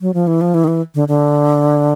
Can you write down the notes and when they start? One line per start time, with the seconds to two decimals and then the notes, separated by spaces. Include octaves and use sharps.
0.01 F#3
0.14 F3
0.27 E3
0.41 F3
0.54 E3
0.64 D#3
0.68 E3
0.95 D3
1.08 D3